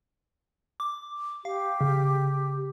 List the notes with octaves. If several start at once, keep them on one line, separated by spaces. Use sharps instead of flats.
D6
G4 F5
C#3